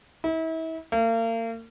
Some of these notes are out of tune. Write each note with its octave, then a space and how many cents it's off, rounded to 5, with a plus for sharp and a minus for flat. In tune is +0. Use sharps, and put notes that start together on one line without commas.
E4 -35
A#3 -40